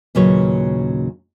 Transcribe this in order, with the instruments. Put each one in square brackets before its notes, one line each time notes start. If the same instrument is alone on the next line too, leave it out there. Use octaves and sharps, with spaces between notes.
[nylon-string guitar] D#2 A#2 C#3 F#3 B4 C#5